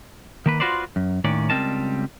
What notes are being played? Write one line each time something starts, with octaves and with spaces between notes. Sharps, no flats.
D#3 A#3 B4
F4 F#4 B4 C5 D5
F#2
D#2 A2 D#3 C#4 D5
C#2 G3 C4 A#4 D#5 A5